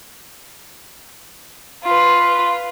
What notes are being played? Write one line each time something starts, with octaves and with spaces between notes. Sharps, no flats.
F4 B4